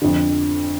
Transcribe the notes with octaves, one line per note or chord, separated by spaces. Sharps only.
F2 D3